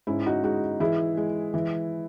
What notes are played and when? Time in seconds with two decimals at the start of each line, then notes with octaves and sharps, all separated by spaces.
0.07 G#2 C#4 E4
0.26 D#4 F#4
0.44 G#3 D#4 F#4
0.80 E3 E4 G#4
1.17 G#3
1.54 E3